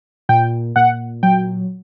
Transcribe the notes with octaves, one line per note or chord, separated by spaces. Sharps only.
A#2 G5
A#2 F#5
F#3 G5